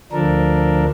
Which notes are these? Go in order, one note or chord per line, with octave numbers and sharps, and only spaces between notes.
D2 F3 D4 A4 A#4